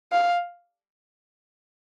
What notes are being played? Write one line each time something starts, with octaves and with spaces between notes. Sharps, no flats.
F5